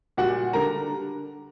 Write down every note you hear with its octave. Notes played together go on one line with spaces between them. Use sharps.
A#2 G3 F#4 F#5
D3 G3 A#4 A#5